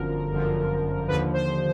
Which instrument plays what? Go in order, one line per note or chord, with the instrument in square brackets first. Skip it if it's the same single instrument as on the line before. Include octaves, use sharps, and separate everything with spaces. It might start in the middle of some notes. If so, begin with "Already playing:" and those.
Already playing: [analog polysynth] G1 F#2 D3 F3 A#4
G1 F#2 D3 F3
D#2 D3 F3 B4
C5